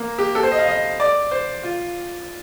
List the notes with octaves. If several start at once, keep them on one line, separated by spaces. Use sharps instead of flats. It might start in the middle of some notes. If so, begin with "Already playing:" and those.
Already playing: A#3
G4
A4
C5
D#5
F5
D#5
D5
C5
F4